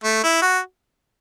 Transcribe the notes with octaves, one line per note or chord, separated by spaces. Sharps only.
A3
E4
F#4